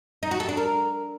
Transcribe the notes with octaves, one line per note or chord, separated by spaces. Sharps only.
D#4
F#4
A4
D4
A#4